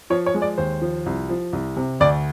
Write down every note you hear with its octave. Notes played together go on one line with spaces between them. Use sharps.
F3 C#5
C#5
G#3
D5
D#2 C5
F3
C2
F3
C2
C3
D2 D5